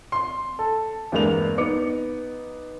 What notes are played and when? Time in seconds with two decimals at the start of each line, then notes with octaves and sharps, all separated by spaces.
0.12 C6
0.59 A4
1.12 E2 G2 G#3 A#3 F7
1.58 B3 D#4 D6 C#7